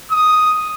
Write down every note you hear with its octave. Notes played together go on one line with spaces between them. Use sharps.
D#6